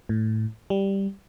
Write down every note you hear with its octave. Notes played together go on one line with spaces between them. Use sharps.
A2
G3